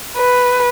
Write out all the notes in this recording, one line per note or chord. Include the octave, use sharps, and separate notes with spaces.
B4